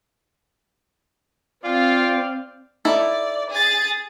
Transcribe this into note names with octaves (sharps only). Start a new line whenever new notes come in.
C4 F4 D5 F5 G5
D#4 E4 A4 D5
G#4 A6